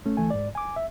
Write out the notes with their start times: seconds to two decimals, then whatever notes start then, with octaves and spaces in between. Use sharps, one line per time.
0.06 A3 C#4
0.17 D2 E3 A3 G#5
0.30 G#2 D5
0.55 G#5 D6
0.76 E5